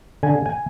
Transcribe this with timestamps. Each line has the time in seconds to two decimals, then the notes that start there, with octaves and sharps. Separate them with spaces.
0.23 D3 G#5
0.46 G#5